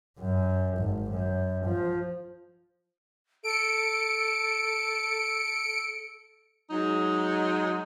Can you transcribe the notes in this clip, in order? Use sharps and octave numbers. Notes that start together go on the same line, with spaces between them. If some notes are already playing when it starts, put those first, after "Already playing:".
F#2
G#1
F#2
F3
A4 C#7 D7
F#3 G#3 D#4